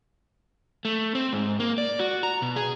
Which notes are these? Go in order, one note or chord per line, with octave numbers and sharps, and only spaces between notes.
A3
C4
G#2
A#3
D5
F#4
A#5
B2
G#4